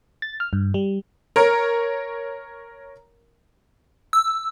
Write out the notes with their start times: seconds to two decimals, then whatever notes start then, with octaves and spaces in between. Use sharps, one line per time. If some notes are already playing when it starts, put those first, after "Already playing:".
0.22 A6
0.40 F6
0.53 G2
0.74 G3
1.36 A#4 C#5
4.13 E6